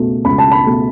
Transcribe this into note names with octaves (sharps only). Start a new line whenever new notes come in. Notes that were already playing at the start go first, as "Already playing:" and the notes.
Already playing: C#2 B2 A3
C#2 B5
A5
B5
B2 A3